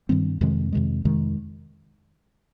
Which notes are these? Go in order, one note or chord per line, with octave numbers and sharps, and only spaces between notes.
G2 D#3 G3 C4
F2 C3 D#3 G#3
F2 C3 D#3 G#3
F2 C3 D#3 G#3